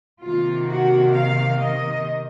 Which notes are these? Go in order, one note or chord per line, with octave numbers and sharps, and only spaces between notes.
C3 D#3 A#3 F4
F#4
F5
D#5